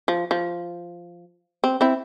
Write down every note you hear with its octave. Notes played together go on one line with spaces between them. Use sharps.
F3
F3
C4
C4 E4